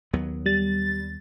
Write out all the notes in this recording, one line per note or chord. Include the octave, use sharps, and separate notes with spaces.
D#2 F#3 B3
G3 A6